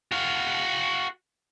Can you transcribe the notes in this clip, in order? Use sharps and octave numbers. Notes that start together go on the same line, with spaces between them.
F#4 F5